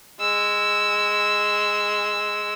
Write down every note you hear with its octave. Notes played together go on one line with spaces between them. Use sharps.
G#3 E6